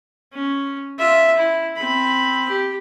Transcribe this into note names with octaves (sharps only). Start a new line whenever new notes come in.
C#4
F4 E5
E4
C4 B5
G4